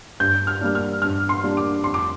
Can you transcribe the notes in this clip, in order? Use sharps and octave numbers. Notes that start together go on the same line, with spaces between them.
G2 G6
F6
G3 A#3 D4
F6
G2 F6
C6
G3 A#3 D4
D6
F2 C6
D6